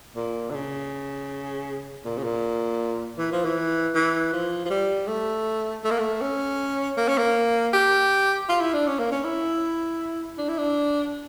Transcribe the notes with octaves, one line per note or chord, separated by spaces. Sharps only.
A#2
D3
C#3
A#2
C#3
A#2
E3
F3
E3
E3
F3
F3
G3
A3
A3
A#3
A3
C#4
A#3
C#4
A#3
G4
F4
E4
D4
C#4
A#3
C#4
E4
D4
E4
D4